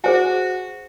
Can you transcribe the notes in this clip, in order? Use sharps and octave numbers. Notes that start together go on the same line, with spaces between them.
F#4 G#4 C5 G#5